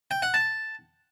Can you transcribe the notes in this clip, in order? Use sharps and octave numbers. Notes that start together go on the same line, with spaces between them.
G5
F#5
A5